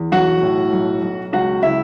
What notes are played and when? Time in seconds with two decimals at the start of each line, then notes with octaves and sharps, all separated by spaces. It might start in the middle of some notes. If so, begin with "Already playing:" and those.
Already playing: E2
0.12 B1 F#4 F#5
0.42 A2
0.72 B1
1.02 B1
1.32 C#2 F#4 F#5
1.63 C#3 E4 E5